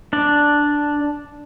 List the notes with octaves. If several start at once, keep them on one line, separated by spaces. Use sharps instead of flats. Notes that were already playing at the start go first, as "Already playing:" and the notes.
D4 D5